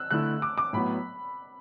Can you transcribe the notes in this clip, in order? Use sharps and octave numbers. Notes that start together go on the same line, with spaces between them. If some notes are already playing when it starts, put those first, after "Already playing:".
Already playing: E6 F#6
D3 A3 E4 F#6
D6
D6
A2 F#3 B3 B5